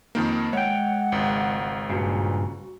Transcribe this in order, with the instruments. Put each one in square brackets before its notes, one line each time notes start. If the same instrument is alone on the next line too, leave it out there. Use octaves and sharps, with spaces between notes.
[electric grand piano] F2 D#3 A#3
[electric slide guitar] G#3 G5 [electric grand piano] C#5 [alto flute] F#5
[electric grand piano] G#1 C#2
[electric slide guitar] G2 A#2 C#3 [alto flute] F#4